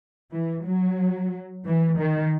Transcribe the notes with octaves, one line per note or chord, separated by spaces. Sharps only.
E3
F#3
E3
D#3